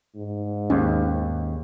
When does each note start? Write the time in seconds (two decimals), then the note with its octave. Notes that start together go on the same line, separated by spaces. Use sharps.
0.16 G#2
0.70 D#2 C#4